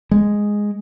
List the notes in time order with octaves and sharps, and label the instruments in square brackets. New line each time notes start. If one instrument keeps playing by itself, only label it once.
[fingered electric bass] G#3